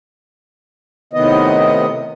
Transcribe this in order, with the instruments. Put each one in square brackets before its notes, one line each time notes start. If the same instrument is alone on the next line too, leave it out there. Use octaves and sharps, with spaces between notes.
[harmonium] A2 C3 D#3 B3 D#5